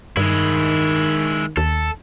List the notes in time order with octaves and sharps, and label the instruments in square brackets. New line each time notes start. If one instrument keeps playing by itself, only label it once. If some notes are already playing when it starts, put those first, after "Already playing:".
[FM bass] G2 [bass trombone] D#3 [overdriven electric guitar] G#3 E4
[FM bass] D#2 [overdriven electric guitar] A4